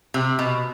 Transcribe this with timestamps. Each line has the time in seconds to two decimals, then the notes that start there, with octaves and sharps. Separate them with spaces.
0.14 C3
0.39 B2